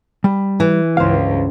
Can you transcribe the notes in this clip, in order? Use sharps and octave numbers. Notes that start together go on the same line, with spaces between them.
G3
E3
C#2 G2 C5 F5